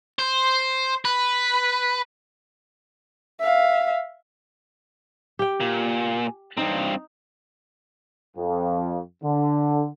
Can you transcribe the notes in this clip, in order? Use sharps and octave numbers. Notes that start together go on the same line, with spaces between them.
C5
B4
E5 F5
G4 G5
A#2
G2 C4 D#4
F2
D3